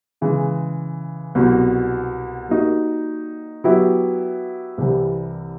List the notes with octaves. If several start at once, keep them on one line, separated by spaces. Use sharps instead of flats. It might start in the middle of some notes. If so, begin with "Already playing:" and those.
C#3 E3 G#3
C2 B2 F#3
G3 A#3 D#4 F#4
F#3 B3 E4 G4
C2 C3 E3 G3